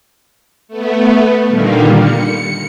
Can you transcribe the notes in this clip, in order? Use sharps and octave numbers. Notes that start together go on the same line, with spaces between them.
A3 B3
A#2 D3 D#3 G3 A#3
C#7